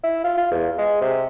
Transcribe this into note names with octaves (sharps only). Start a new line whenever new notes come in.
E4
F4
F4
E2
G#3
C3